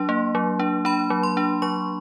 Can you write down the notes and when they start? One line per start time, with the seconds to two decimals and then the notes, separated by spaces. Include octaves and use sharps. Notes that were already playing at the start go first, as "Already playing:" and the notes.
Already playing: F#3 D4 C6
0.09 A#3
0.35 F#3
0.60 D4
0.85 D4 B5
1.10 F#3
1.23 C6
1.37 D4
1.62 F#3 C#6